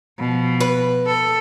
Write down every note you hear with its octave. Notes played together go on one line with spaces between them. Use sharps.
B2 F3
B4
A4